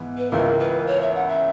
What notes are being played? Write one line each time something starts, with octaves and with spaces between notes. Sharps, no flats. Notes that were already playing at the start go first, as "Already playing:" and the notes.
Already playing: G#2 E3 B3
B4
C#2 C#3 E3 A#3 A#4
B4
C#5
E5
F#5
E5